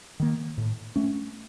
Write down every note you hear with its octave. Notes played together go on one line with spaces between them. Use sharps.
D#3 A#3
A2
A3 C#4